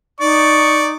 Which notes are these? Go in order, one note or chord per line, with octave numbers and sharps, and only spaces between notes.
D#4 D5 C#6